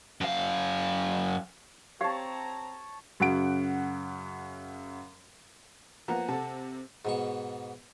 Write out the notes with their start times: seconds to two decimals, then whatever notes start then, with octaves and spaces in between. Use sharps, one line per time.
0.21 F#2 F5
2.01 C4 G4 C#5 F5 A5 A#5
3.20 F#2 C#3 F#5 D7
6.08 F3 A#3 B3 F#5 A#5
6.28 C3 A4 F#5 A5
7.05 G#2 B2 C#6